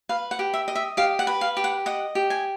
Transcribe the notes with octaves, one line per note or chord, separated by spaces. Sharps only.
B4 F5
F#5
G4
E5
D#5
E5
G4 F5
F#5
B4
F5
G4
F#5
D#5 F#5
G4
G#5